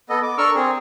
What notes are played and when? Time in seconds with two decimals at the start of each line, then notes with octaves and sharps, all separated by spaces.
0.10 B3 A4 D#5
0.22 D6
0.38 D4 A4 A#4 C#6 E6 F6
0.55 C4 G#4